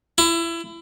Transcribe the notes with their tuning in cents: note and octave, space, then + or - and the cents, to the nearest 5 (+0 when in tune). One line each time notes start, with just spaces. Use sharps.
E4 +25